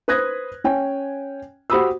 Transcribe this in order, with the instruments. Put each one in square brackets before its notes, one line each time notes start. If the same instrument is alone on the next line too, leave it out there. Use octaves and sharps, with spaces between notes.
[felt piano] B4 C5 D#6 F#6 G#6 A#6
C#4 G5 G#5
F#4 G4 C5 B5 D#6 E6